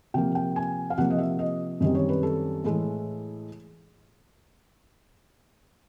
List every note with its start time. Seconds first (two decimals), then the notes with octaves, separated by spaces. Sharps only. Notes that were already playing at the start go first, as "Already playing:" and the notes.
0.14 C3 F3 A#3 G5
0.35 G5
0.56 G#5
0.90 F5
0.98 C3 F3 A#3 F#5
1.10 D#5
1.18 E5
1.39 D#5
1.80 F#2 D#3 G3 C4 D#5
1.95 C#5
2.09 B4
2.23 A4
2.64 A2 E3 G#3